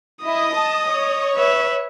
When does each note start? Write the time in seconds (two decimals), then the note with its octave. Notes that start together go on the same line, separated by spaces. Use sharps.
0.24 E4 D#5 D#6
0.55 A5
0.89 C#5
1.36 B4 E5